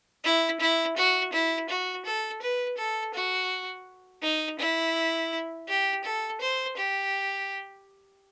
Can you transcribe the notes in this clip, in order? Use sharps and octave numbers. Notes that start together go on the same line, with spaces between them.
E4
E4
F#4
E4
F#4
A4
B4
A4
F#4
D#4
E4
G4
A4
C5
G4